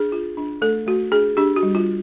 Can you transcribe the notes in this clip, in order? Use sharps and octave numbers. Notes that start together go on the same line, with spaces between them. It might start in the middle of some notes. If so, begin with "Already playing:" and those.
Already playing: D4 G#4
F4
D4
A3 A4
A3 F#4
D4 G#4
D4 G4
F#4
G3
F4